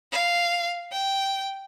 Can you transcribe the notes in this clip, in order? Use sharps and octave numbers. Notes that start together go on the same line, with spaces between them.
F5
G5